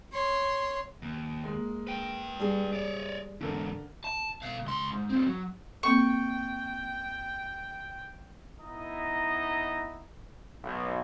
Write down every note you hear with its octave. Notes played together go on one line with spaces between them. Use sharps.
C#5 C6
D#2
G#3 A#3
B4 G5
G3 G#4
C#5 D5
E2 G#2 D3 A4 A#4
A5
B2 F5
C#2 C6
G#2
F#3 C4
F#3
A#3 C4 A4 G5 C#6
B3 D#4 E4 D#5 A#5
B1